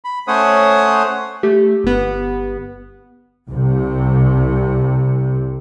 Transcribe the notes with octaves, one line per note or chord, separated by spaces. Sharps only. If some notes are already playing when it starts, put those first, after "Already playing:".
B5
A3 C#4 C5 C#5 F#5 D#6
A3 G4
G1 B3
C2 C3